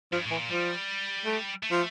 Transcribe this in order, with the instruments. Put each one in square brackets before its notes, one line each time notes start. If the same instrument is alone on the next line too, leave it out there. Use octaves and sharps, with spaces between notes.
[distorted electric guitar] G2 [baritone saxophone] F3
[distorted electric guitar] A2
[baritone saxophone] E3
[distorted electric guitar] A#2
[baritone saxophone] F3 [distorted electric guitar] G3
[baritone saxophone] A3
[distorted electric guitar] A3
[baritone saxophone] F3